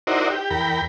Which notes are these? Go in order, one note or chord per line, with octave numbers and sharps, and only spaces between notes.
D#4 E4 F#4 A#4 C5 D5
G4
E2 A#4 G5 B5